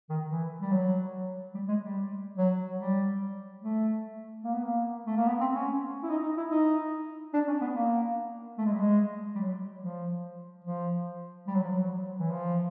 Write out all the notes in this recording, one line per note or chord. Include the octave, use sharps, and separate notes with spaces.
D#3
E3
G3
F#3
G3
G#3
G3
F#3
G3
A3
A#3
B3
A#3
A3
A#3
B3
C4
C#4
E4
D#4
D#4
E4
D#4
D4
C#4
B3
A#3
A3
G#3
G3
G#3
G3
F#3
F3
F3
G3
F#3
F3
F#3
E3
F3